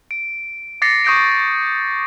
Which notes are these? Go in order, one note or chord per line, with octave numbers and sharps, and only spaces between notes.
D7
D6 A6 A#6 C7 C#7
C#6 D#6 G6 A#6 D7